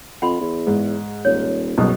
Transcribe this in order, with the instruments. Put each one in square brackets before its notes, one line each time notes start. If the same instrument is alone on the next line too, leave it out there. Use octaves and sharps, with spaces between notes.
[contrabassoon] F2 [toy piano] F#5 B5 C6
[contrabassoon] E2
[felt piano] G#2
[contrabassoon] D#1 [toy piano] C#5
[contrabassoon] F#1 [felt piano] B1 G2 B2